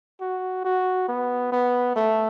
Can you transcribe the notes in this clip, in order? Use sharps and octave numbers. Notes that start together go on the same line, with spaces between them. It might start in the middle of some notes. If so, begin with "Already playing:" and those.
F#4
F#4
B3
B3
A3